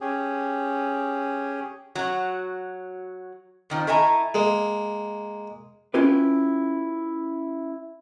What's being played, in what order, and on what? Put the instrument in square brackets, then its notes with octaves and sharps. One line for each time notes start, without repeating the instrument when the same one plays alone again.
[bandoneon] C#4 G4 G#4
[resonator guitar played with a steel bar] F#3 F#4
F2 D#3 F3
A3 E4 D#5 G#5 A#5
[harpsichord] G#3 A#3
[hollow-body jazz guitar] C#4 E4 F4 G4 B4